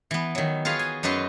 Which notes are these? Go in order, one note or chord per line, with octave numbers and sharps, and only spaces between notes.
E3 B3
D#3 F#3
F4 F#4 G#4 B4 F5
G#5
F#2 D#4 F#4 B4 C6